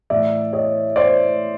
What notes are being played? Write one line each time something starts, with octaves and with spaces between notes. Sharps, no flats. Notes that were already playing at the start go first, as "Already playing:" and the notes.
A2 E3 D5 E5
C#5 D#5
C5 D5